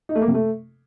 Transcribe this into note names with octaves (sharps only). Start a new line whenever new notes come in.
D#4
A3
A#3
C3
A3